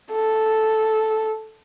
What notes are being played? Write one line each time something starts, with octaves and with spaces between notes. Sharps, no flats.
A4